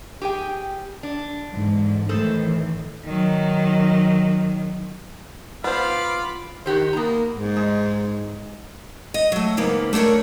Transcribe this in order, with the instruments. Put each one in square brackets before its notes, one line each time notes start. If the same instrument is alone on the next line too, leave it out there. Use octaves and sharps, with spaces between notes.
[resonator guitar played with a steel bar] G4 G#4 G5
D4
[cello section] E2 G#2 D3
[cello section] A2 D#3 E3 [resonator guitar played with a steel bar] G#4 A4 C5
[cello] D#3 F#3
[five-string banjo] B3 C5 [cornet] F4 [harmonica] F5 [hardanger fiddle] B5 D6
[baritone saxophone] D#3 [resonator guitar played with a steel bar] F#4 G4 C5
[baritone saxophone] A#3 [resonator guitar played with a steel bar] B3 A#5
[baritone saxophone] G#2
[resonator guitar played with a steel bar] G#3
[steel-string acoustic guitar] D#5
F#3 A3
G#2 C#3 A#3 B3
A3 D4 A4 A#4 C#5